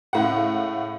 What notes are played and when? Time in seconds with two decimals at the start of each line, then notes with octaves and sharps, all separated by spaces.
0.13 C#2 A2 F#5